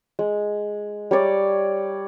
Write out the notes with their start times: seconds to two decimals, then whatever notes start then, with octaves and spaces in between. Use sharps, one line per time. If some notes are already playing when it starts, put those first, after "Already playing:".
0.19 G#3
1.11 G3 C#5 D5